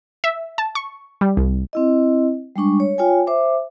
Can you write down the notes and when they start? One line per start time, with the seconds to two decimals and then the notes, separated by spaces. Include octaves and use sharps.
0.24 E5
0.58 A5
0.75 C#6
1.21 G3
1.37 C2
1.73 C4 E4 D#5
2.56 G3 G#3 D4 C#6
2.80 C#5
2.98 F4 C#5 G5 G#5
3.27 C5 E5 D6